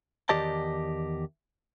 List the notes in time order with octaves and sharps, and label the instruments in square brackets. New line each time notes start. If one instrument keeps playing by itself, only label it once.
[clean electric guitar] E2 D#3 G4 D5 D#5 A5